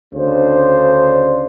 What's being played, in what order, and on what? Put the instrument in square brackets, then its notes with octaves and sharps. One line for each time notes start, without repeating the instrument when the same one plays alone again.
[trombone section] D2 C#3 D4 C5